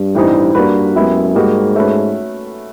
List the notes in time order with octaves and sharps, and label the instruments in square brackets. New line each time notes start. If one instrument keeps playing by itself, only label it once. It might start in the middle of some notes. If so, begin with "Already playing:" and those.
Already playing: [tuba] G2
[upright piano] A2 E3 G3 C4 D#4
[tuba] G2 [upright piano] A#3 D4 F#4 B4
[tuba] F#2 [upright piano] G#3 B3 E4 G4
[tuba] G#2 [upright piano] G3 A#3 D#4 F#4
[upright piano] A3 C#4 F#4 B4